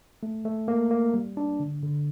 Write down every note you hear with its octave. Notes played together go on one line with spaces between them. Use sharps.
A3
A3
A#3
A#3
G3
D4
D3
D3